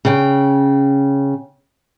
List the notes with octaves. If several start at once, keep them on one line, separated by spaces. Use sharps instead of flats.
C#3 G5